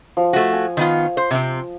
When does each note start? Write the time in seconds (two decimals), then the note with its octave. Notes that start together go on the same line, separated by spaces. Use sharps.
0.17 F3
0.33 A3 F#4
0.53 G#5
0.77 D#3 B3 F4
1.17 C5
1.31 C3 C4